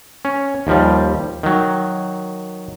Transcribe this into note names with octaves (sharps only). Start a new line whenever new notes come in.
C#4
D#2 F3 G3
D#3 F#3